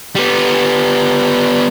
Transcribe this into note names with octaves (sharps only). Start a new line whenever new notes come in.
G3 B3